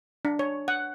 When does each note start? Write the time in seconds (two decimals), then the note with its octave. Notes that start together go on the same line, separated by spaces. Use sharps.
0.25 D4
0.39 C#5
0.68 F#5